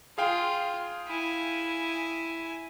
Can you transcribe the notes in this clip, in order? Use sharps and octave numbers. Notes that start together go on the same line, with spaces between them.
F4 G#4 F5 G5
E4 G#5